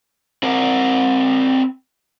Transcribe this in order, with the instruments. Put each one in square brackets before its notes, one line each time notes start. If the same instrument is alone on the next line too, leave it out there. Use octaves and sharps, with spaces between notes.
[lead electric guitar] C4 A#4